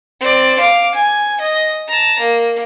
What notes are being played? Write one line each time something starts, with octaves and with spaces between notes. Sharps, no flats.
C4 D5
F5 D6
G#5
D#5
A5 A#5
A#3